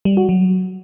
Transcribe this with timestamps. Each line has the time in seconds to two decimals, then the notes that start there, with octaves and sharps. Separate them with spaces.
0.05 G3
0.17 F#4
0.29 F#3